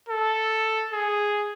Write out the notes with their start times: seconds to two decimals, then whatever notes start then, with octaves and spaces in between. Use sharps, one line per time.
0.09 A4
0.93 G#4